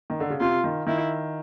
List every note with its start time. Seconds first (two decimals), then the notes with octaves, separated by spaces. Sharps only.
0.10 D#3
0.20 D3
0.30 C#3
0.40 C3 F4
0.64 D#3
0.86 D#3 E4